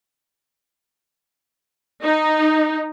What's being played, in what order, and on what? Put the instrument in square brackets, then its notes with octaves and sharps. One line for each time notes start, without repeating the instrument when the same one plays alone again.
[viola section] D#4